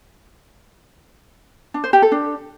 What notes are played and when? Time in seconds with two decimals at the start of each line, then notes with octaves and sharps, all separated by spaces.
1.74 D4
1.84 C5
1.93 G4
2.02 A4
2.12 D4